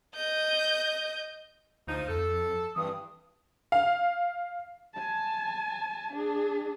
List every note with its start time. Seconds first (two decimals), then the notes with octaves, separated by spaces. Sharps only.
0.16 D#5 G6
1.87 D2 F3 D#4
2.09 F2 A4
2.76 G2 E3 C4 D#6
3.72 F5
4.93 G#5 A5
6.13 D4 G#4